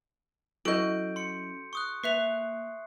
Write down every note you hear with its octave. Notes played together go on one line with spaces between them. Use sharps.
F#3 C#4 E4 F#4 A4 D#5 G6 D7
C6 C#7
C#6 D#6 F#6
A#3 B4 E5 C7 F7